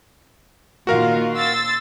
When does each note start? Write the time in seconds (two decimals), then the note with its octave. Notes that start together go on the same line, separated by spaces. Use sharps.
0.87 A#2 D#3 F4 F#4 A#4 F5
1.34 C6 E6 A6